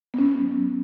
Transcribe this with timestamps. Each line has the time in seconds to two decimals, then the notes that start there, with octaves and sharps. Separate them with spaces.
0.14 B3
0.18 G#2 C#4
0.38 F#3
0.57 F#3